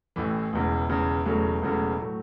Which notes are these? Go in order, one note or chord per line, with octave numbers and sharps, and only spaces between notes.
A1 A2 E3
E1 E2 C#3
E1 E2 C#3
E1 E2 C#3 F#3 A3
E1 E2 C#3 F#3 A3
A2 F#3 A3